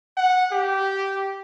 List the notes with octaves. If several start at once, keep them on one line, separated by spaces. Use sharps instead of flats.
F#5
G4